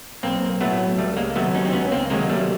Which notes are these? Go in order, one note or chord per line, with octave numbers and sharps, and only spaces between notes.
B1 A#3 C4
A2 F#3 A3 B3
C#2 G3 A3
G#3 A#3
C3 D#3 F#3 A3 B3
C#4 D#4
C4
C#2 B3 C#4
A#3 C4
C3 D#3 F#3 G#3 A#3
G3 A3